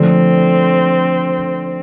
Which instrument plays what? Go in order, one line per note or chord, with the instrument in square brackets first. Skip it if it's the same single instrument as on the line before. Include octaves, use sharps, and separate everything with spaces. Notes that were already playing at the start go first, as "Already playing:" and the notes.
Already playing: [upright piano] D3 F3 A3 D4 A4 [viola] C4